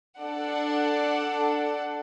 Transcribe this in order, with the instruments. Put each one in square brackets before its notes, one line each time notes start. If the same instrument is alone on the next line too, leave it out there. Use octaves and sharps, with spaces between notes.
[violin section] D4 A4 D5 F#5